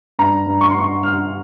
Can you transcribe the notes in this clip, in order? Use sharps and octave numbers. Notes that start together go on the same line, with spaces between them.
G2 A#5
G2
C#6
C6
G2 C#6
G2 F6